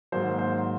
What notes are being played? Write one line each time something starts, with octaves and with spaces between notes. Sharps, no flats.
G#2 D#3 F#3 A#3 C5
C5